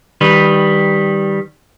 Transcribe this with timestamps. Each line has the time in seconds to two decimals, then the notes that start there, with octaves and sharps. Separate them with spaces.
0.21 D#3 G3 B4